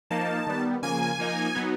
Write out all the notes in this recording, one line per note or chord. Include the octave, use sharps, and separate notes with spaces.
F3 A#3 D#4 A5
D#3 G3 B3
C#3 F3 A#3 G#5
F3 A#3 D#4
F#3 B3 D#4